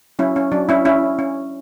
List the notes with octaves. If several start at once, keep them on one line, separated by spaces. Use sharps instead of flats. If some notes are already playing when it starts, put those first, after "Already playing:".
F#3 C#4 E4
C#4
F#3 D4
C#4 E4
C#4 E4
C#4